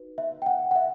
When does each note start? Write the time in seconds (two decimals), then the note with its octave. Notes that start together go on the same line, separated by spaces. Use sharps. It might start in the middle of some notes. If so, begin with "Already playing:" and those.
Already playing: D#4 F#4 B4
0.18 E5
0.42 G5
0.46 F#5
0.71 F#5
0.75 E5